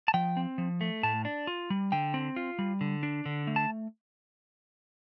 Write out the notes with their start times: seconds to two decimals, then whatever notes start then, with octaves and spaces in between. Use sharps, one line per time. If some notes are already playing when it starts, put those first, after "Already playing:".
0.08 A5
0.14 F3 G5
0.37 C4
0.58 F3
0.81 A3
1.03 A2 A5
1.25 D4
1.47 F4
1.70 G3
1.92 D3 G5
2.14 C4
2.36 F4
2.59 G3
2.81 D3
3.03 D4
3.26 D3
3.47 A3
3.56 A5